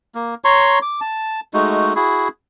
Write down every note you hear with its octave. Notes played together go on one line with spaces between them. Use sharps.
A#3
C#5 A#5 C6 C#6
D6
A5
G#3 A3 D#4 F#4
E4 F#4 G#4